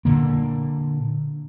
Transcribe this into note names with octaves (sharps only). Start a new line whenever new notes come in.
A#2 D3 A#3